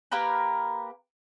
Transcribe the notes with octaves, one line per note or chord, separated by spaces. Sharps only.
A#3 G4 A#4 B4